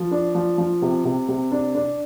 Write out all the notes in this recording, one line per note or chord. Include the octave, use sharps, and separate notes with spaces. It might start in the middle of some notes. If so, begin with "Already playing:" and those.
Already playing: F3
D4
F3
F3
C3
C3
C3
D4
D4